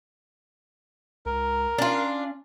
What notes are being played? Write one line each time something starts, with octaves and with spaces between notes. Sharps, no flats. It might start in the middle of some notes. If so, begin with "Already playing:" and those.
C#2 A#4
C#4 D4 F4